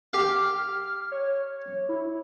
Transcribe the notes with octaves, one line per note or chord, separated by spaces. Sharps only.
G4 F5 F6
C#5
E4